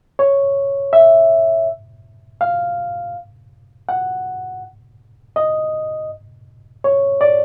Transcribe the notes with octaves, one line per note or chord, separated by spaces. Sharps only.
C#5
E5
F5
F#5
D#5
C#5
D5